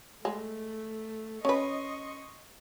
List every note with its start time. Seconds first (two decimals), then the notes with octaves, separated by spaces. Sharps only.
0.25 G#3 A3
1.45 C#4 B4 D#5 C6 C#6